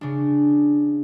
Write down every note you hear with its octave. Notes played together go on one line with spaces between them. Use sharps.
C#3 D4